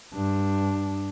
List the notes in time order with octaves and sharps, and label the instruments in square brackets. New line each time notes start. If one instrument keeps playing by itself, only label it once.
[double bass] G2 D4